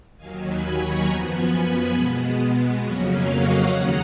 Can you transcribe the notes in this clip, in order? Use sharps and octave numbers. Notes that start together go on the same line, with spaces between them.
D#2 D#3 F#3 F5 G#5
G#5 B5
A#5 C#6
F#2 F3 B3 G#5 B5
G#5 B5
G#5 B5
B2 G#3 B3
F2 C#3 F#3 A#3 C#4 D#5 F#5
C#5 F5
D#5 F#5
D#2 D#3 G#3 C#4 F#5 A#5